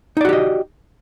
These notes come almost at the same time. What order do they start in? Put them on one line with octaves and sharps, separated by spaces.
D#4 D5 F#4 G4 D#5